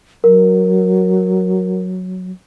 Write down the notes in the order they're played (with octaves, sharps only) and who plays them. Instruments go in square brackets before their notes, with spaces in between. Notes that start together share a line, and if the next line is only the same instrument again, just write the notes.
[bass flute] F#3 [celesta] A#4